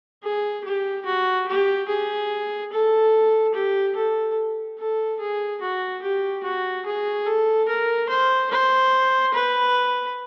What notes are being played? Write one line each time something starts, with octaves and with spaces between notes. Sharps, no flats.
G#4
G4
F#4
G4
G#4
A4
G4
A4
A4
G#4
F#4
G4
F#4
G#4
A4
A#4
C5
C5
B4